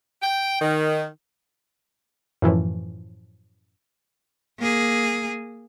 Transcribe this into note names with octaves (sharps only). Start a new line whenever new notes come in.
G5
D#3
F#2 A2 E3 F3
A#3 G#4